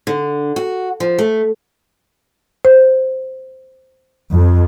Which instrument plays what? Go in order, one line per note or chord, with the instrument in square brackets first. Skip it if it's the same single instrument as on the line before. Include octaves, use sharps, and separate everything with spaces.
[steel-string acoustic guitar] D3
F#4
F3
A3
[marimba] C5
[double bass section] F2